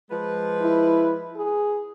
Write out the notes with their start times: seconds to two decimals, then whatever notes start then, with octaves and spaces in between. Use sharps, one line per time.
0.11 F3 G#3 B4
0.61 E4
1.37 G#4